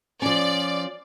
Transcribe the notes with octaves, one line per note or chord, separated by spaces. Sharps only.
F3 C#4 D5